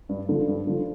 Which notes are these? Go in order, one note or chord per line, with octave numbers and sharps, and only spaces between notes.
G2
D3 F3
G2
D3 F3